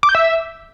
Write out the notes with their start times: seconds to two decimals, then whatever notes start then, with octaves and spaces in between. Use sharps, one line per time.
0.03 D6
0.09 G6
0.15 E5